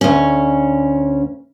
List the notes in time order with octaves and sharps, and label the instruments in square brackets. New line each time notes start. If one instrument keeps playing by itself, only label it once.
[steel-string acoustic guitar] D2 C#4